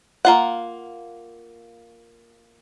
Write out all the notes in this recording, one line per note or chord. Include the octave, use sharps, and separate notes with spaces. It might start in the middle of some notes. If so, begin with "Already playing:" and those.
A#3 F4 F#5